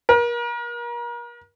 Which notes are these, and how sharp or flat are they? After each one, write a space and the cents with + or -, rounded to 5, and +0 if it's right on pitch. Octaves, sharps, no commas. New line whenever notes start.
A#4 +35